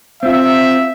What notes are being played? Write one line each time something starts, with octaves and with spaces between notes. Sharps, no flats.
C4 F4 E5